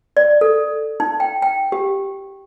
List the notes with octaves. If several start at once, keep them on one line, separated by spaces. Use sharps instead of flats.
D5
A4
D#4
G5
G5
G4